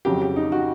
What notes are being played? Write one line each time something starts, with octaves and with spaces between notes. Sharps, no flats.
F2 C#3 F#3 G4
G4
D#4
F#4